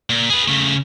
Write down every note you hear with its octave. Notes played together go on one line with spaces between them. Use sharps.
A#2
G#4 B4
C#3 A3